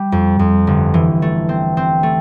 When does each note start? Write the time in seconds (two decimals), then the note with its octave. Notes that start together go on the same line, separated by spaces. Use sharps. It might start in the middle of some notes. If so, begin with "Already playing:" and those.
Already playing: G3
0.12 F2
0.39 F2
0.67 G1
0.94 E3
1.22 A3
1.49 C4
1.77 C4
2.03 A3